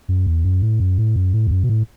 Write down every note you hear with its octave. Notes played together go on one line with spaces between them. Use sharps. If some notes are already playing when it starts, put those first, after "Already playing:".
F#2
E2
F#2
A2
F#2
A2
F#2
A2
E2
F#2
B2
A2